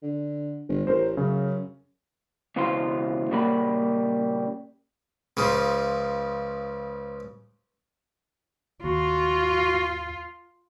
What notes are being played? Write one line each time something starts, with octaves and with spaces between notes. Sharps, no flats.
D3
G1
A1 A#4 C5
F#2 C#3
C#2 B2 E3 F3 F4 C6
A#2 C#3 G3 A#3 B5
C#2 C#3 F3
D#2 F4 F#4